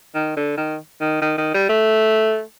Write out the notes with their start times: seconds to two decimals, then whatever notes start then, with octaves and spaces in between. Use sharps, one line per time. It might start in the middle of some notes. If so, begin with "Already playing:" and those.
0.15 D#3
0.37 D3
0.57 D#3
1.01 D#3
1.22 D#3
1.38 D#3
1.54 G3
1.69 A3